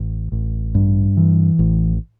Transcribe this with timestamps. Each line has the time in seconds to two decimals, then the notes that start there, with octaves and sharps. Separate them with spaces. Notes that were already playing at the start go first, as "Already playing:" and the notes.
Already playing: A1
0.32 A1
0.75 G2
1.17 E3
1.59 A1